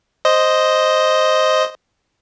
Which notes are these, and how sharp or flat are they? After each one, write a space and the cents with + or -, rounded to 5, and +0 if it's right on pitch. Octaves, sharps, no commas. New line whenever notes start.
C5 +0 D#5 +0